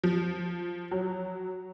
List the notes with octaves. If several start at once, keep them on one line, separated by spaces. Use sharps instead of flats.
F3
F#3